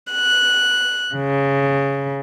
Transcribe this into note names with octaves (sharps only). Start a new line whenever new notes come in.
F#6
C#3